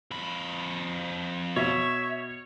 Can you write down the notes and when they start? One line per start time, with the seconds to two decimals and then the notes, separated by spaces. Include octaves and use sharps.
0.11 F2 B5
1.56 B2 C#5 E5